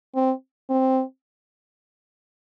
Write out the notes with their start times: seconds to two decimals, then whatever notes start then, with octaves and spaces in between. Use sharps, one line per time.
0.15 C4
0.69 C4